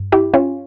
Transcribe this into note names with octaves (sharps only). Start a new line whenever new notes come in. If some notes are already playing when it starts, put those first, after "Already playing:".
Already playing: G2
E4 G4
C#4 F4